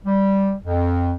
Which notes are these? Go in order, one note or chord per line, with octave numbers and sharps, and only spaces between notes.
G3
F2